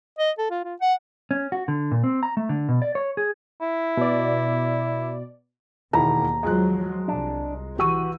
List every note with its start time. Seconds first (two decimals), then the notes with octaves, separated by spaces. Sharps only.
0.19 D#5
0.38 A4
0.51 F4
0.65 F4
0.81 F#5
1.31 C#4
1.52 F#4
1.68 D3
1.91 A#2
2.04 C4
2.23 A#5
2.37 A3
2.49 D3
2.69 B2
2.82 D5
2.95 C#5
3.17 G#4
3.61 E4
3.97 B2 D5
5.93 E1 D#2 D#3 E4 A#5
6.43 F3 F#3 G#3 F4 F#6
7.08 C2 D4
7.79 E3 F#4 G4 E6 D#7